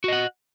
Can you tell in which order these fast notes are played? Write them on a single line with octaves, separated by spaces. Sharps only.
F#4 D#5 F#5